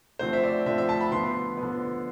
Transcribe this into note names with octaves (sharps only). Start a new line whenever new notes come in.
D3 F3 A3 C4 C5
E5
D5
D3 F3 A3 C4 E5
E5
A5
B5
D3 F3 B3 C6
D3 F3 B3